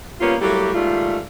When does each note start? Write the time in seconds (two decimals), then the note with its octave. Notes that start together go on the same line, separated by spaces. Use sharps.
0.20 G3 A#3 B3 C#4 F4
0.41 F#3 G3 A3 A#3 E4 G4
0.74 D#2 G#2 G3 A3 F4